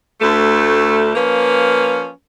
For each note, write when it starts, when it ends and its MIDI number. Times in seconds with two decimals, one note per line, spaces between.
0.21 1.11 38
0.21 1.11 57
1.15 2.09 53
1.15 2.09 58
1.15 2.09 61
1.15 2.09 71